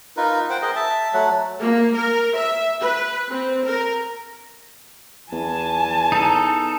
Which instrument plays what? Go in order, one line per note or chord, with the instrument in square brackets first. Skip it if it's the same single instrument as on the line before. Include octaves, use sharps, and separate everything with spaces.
[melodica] D#4 F4 A#4 B4
C5 F#5 G5
G#4 A#4 D#5 G5
E5 A5
F#3 A3 F#5
[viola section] A#3
A#4
E5
B4
C4
A#4
[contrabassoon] E2 [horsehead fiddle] G#5 A5
[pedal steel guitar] D#4 A4